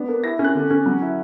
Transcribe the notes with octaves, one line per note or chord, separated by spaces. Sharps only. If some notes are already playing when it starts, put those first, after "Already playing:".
Already playing: B3 D4
A#3
E4 A#6
C#4
F#6
D3
C#4
F#3
E4